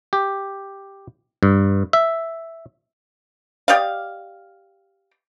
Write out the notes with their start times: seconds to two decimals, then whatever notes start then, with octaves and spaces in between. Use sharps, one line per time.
0.13 G4
1.43 G2
1.93 E5
3.68 G4 D5 D#5 F5